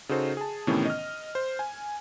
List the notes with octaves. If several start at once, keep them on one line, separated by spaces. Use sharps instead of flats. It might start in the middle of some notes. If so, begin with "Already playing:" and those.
C#3 D#4 F#4 A4 C5
G#4 A5
A2 C3 D#3 E3 B3 C#4
D#5 F6
C5
G#5